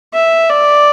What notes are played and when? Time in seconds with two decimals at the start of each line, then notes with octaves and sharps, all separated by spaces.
0.14 E5
0.50 D5